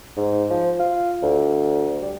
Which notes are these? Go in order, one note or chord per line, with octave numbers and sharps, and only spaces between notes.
G#2
F3
F4
D2
G3